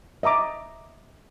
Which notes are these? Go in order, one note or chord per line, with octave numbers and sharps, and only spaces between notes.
D#5 E5 A#5 D6